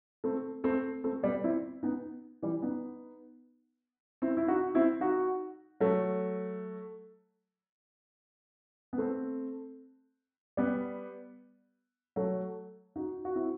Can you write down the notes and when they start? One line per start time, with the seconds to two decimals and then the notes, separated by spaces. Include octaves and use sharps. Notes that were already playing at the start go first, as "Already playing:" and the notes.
0.24 A3 C4
0.64 A3 C4
1.04 A3 C4
1.23 G3 B3
1.44 C4 E4
1.83 B3 D#4
2.42 E3 G3
2.62 B3 D#4
4.22 C4 E4
4.37 E4
4.48 D#4 F#4
4.75 C4 E4
5.01 D#4 F#4
5.80 F#3 A3
8.93 B3
8.98 A3 C4
10.57 G3 B3
12.16 F#3 A3
12.96 D#4 F#4
13.25 F#4
13.35 C4 E4